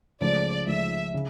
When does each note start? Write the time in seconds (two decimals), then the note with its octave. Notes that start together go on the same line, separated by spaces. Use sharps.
0.21 C#2 C#3 F3 A3 D5
0.67 C#2 C#3 F3 A3 E5
1.14 C#3